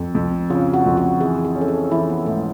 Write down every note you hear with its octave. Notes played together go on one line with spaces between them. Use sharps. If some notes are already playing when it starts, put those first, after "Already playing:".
Already playing: F2
F2
C#3 F4
F#4
F2
F#4
E3 G#4
G#4
C#4
A4
G#4
E3 E4
B3
G#2 A3